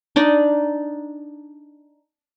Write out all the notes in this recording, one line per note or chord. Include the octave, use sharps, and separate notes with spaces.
D4 D#4 D5 D#5